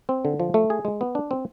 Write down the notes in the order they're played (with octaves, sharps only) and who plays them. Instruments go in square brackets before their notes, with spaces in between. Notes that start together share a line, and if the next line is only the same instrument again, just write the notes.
[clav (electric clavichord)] C4
D3
F3
A3
G#4
G#3
B3
D4
C4